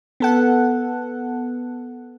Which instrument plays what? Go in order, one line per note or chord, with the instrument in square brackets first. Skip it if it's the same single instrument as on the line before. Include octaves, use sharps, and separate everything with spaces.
[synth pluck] B3 A4 F#5